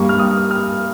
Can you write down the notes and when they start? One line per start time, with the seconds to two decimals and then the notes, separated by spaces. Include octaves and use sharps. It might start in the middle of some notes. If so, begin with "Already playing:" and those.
Already playing: G2 G3 A#3 C#6
0.09 F6
0.19 D#6
0.51 F6